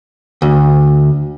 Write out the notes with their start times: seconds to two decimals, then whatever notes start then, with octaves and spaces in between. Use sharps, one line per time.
0.42 D2